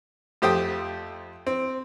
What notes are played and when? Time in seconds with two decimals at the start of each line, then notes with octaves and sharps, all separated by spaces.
0.42 F2 A3 G4 C5 G5 D#6
1.47 C4